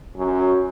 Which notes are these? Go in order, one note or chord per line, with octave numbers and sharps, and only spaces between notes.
F#2